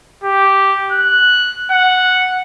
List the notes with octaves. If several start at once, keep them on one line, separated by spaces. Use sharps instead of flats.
G4
F#6
F#5